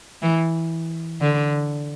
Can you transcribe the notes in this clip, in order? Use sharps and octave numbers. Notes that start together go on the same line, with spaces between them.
E3
D3